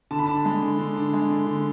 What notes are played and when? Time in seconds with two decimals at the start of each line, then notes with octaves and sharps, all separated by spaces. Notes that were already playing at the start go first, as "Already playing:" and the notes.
0.11 D3 A5
0.19 B5
0.27 D4 A5
0.45 G#3
0.63 D3
0.79 D3
0.96 D4
1.13 G#3
1.30 D3
1.47 D3